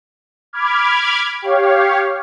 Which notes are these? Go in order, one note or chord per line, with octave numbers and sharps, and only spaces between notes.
B5 D6 F6 G#6
G4 C#5 F5